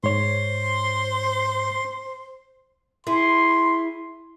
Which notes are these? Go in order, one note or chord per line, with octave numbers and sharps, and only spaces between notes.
G#2 C5 C#5 C6
E4 G#4 C6